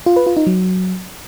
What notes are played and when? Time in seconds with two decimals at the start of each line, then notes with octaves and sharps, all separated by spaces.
0.06 F4
0.16 B4
0.27 F4
0.37 D#4
0.47 F#3